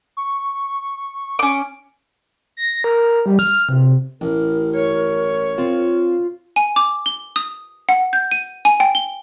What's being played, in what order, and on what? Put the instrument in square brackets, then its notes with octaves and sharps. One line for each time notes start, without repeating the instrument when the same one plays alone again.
[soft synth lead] C#6
[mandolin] C#4 D6
[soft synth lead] A#6
A#4
G3
F6
C3
[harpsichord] A1 [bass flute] A#4
[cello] C#5
[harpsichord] C4 [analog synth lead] F4
[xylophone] G#5
D6
G7
D#6
F#5
G6
D#7
G#5
G5
G7